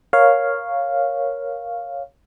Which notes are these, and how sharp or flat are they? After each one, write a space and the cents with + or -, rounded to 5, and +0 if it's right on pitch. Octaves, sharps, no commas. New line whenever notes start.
A#4 +10 C#5 +0 F5 +0